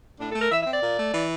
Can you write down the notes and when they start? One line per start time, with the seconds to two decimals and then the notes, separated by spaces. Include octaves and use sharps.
0.19 A2 D4
0.30 A4
0.35 A3
0.41 A#4
0.51 E3 E5
0.62 E5
0.66 C4
0.72 D5
0.83 A#2
0.99 A3
1.14 E3